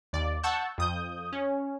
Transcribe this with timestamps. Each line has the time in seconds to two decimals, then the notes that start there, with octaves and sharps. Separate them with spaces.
0.13 D#2 D5
0.43 F#5 A5 C#6 E6 G6
0.78 F2 D#6 G6
1.33 C#4